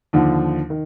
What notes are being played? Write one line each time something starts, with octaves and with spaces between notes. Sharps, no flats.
D#2 D3 F3
D#3